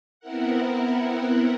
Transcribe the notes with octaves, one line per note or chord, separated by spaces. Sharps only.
B3 C4 E4 A#4 F#5